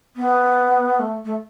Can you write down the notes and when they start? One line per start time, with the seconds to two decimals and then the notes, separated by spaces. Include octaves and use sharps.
0.16 B3
0.99 A3
1.25 A3